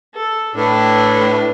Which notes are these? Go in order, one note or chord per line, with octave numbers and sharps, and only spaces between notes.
A4
A2 D4 B4